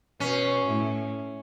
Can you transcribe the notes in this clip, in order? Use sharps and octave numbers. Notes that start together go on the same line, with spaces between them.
B2 C#4
A2